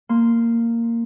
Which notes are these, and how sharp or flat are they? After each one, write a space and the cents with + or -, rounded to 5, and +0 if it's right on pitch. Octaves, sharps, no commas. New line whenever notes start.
A#3 -10 C6 -10